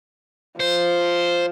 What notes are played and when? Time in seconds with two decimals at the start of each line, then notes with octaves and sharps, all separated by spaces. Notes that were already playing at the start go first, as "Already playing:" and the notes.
0.60 F3 C5